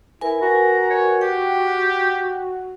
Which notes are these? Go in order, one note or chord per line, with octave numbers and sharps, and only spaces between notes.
E4 A#4 B4 G#5
F#4 A#5
C#5
G4 G5